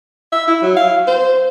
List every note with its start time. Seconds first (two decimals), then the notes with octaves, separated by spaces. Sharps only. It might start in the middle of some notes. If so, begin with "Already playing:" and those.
0.32 E5
0.47 E4
0.62 F#3
0.77 F5
1.07 C5